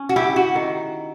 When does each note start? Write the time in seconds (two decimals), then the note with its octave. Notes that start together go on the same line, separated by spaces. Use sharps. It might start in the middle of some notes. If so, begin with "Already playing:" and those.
Already playing: C#4
0.09 F#4
0.16 E4 G4
0.36 F#4
0.55 D#3